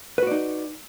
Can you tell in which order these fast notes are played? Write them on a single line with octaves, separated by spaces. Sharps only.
B4 F#4 D5 D#4